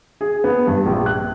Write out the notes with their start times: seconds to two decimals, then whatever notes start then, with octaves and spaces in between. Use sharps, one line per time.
0.21 G#4
0.44 B3
0.67 G2
0.86 A#1
1.06 F#6